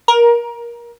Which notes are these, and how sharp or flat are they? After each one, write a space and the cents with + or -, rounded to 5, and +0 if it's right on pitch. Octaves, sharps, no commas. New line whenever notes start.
A#4 +20